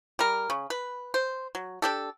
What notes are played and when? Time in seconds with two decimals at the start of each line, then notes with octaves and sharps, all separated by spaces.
0.19 G3 A#4
0.50 C#3
0.70 B4
1.14 C5
1.55 F#3
1.82 D4 G4 A4